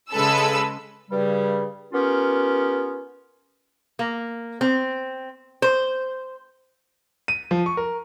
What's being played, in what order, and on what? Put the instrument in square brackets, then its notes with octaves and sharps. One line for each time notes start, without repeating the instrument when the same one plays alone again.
[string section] C#3 G#3 A4 B4 E6
[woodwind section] G2 C#3 G3
B3 C#4 F4 G4 A#4
[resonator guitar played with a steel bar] A#3
C4
C5
[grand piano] D#7
F3
C#6
A#4